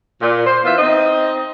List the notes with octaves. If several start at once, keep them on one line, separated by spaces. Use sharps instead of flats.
A#2
C5
E3 B3 F4 C5 E5
C4 D#4 D#5